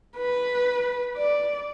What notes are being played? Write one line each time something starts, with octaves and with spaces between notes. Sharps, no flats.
B4
D5